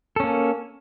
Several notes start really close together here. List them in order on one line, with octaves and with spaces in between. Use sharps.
A4 C#4 A#3